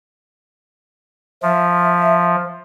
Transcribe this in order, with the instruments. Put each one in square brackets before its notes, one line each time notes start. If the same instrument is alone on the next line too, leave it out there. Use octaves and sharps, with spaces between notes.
[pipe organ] F3 [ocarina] E5